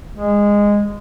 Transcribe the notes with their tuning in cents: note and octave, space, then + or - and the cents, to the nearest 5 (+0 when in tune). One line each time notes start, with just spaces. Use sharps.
G#3 -15